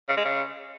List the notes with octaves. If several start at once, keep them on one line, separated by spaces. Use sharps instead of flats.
C#3
G#3
C#3